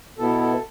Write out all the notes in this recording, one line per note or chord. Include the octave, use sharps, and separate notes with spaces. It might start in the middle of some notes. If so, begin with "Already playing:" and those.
B2 B3 E4 A4
A4